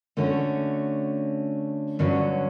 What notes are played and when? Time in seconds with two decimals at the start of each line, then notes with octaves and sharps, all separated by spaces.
0.17 D3 A3 C#4 F#4
1.99 G2 D3 F#3 C#4